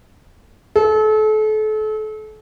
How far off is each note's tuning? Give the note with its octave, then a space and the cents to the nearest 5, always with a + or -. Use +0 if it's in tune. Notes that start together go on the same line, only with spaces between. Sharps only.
A4 -35